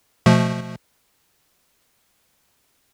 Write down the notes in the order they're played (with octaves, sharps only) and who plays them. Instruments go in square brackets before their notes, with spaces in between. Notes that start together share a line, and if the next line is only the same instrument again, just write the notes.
[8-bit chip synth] B2 F3 A3